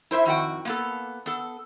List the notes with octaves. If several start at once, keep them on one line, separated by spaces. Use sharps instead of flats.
E4 C5 D5 E5
F2 D#3 F#4 F#5 G5
A#3 B3 A4
B3 A4